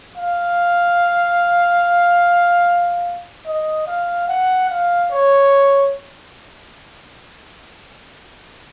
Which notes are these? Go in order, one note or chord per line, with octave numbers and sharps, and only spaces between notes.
F5
D#5
F5
F#5
F5
C#5